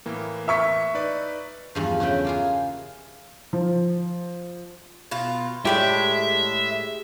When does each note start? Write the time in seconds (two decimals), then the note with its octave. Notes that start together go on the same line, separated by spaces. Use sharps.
0.06 A2 E3 A#3
0.48 E5 C#6 B6
0.95 D#4 B4 D5
1.75 E2 G2 F3
2.00 C#3 A3 E4 B4 G5
2.25 A#3 F4 G#4
3.53 F3
5.11 B2 F4
5.65 A2 G#3 G4 D5 E5